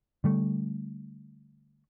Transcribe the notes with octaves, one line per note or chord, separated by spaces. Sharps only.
D3 G3 A3